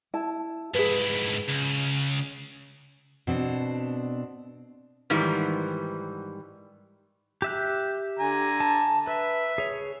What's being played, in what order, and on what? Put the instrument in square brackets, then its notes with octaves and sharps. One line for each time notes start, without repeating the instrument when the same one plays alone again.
[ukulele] E4 A5
[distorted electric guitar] G#2 E4 [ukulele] G#4 B4
[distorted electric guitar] C#2
[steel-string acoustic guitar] B2 C4 D4
[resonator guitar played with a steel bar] G#2 D#3 E3 G3
[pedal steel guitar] G4 E5 F#6
[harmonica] D3 G#5 A#5
[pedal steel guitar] A5
[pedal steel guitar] B4 [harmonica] E5
[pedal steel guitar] G#4 C#5